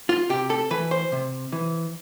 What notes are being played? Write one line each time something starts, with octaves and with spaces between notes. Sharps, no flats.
F4
C3 G4
A4
E3 B4
C5
C3
E3